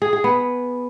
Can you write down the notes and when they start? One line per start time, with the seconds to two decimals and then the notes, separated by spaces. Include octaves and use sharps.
0.02 G#4
0.13 G#4
0.24 B3